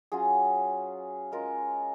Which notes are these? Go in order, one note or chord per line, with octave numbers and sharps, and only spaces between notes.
F#3 C#4 F4 G#4
G#3 C#4 F4 A#4